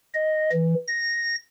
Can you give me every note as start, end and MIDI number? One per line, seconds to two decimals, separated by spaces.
0.15 0.50 75
0.53 0.75 52
0.88 1.36 94